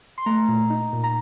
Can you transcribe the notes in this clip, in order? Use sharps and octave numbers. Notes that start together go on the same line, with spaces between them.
C6
A3 A#5
A#2
D#4
A#2
A#5